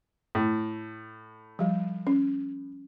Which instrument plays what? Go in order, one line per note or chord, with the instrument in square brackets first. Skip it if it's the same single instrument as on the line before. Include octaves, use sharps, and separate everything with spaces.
[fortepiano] A2
[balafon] F3 G3
C#4